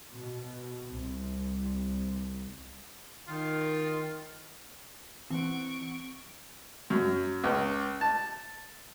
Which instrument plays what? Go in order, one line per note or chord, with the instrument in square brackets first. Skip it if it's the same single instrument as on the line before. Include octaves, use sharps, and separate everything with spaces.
[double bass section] B2
C2
[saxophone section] D#3 [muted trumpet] F4
[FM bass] E3 [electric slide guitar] C4 F#5 [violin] C#6 D7
[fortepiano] F#2
C#2
A5